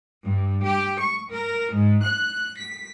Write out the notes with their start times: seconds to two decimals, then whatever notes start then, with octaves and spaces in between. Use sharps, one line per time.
0.24 G2
0.65 G4
1.00 C#6
1.32 A#4
1.74 G#2
2.05 F#6
2.59 B6